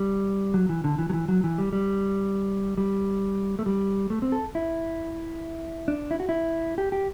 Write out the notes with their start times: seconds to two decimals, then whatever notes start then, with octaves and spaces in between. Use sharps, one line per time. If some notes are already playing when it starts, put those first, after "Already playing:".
Already playing: G3
0.54 F#3
0.69 E3
0.84 D3
0.99 E3
1.10 F#3
1.13 E3
1.28 F#3
1.44 E3
1.58 G3
1.73 G3
2.77 G3
3.59 A3
3.66 G3
4.10 A3
4.22 C4
4.32 A4
4.55 E4
5.88 D4
6.11 E4
6.20 F#4
6.29 E4
6.78 G4
6.92 G4